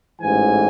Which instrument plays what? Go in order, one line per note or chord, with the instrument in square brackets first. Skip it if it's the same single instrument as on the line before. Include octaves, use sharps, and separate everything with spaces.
[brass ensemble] A1 G#2 E3 G#5